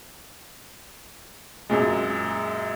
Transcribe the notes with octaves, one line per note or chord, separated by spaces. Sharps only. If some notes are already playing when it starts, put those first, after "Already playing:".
F#2 A#2 G#3